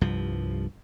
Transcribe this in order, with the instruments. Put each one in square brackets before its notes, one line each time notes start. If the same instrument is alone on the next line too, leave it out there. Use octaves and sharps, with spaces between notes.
[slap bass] C2 G2 F3